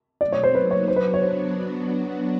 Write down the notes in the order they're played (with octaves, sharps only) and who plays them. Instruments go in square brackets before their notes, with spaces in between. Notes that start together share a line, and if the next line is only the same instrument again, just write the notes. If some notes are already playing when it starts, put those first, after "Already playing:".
[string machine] B2 F#3 A3 C4 [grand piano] D5
[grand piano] C#5
C5
[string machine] F#3 A#3 D#4 F#4 [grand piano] B4
[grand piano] C#5
[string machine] F#3 B3 D4 F#4 [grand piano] C5
[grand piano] B4
C#5
C5